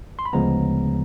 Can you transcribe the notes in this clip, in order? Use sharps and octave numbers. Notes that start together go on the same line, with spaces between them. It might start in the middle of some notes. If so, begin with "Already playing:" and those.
C6
B5
D2 C#3 F3 G#3 B3 A#5